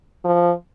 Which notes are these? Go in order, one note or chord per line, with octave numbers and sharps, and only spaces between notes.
F3